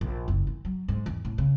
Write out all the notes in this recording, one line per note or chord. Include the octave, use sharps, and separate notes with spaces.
A#1
F#1
E3
F#3
G#2
E2
A2
C#3